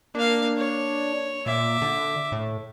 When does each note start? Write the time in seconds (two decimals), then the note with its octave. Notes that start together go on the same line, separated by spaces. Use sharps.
0.15 A#3 D4 F5
0.57 C#5
1.46 A#2 E5 D6
1.82 D3
2.32 A2